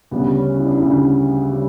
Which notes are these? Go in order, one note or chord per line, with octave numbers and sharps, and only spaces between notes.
D2 C#3 G3 B3
C#4
E4
D4
E4
D2 C#3 G3 D4
C#3 G3